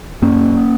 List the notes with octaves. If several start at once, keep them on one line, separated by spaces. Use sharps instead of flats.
F#2 A#3 C#4